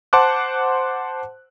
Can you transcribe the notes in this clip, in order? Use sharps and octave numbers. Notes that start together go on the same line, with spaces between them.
C5 F#5 A5 C6 D6 F#6